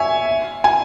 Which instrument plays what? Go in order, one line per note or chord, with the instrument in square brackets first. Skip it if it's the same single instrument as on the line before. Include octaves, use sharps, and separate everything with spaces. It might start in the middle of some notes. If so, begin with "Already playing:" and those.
Already playing: [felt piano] C#5 E5 G#5
G#5